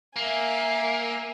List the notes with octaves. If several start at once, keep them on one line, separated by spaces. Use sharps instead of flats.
A#3 E5 G#5